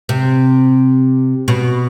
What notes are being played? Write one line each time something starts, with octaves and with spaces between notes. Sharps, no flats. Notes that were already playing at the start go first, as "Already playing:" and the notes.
C3
B2